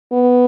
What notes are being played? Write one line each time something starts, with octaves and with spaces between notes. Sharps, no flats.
B3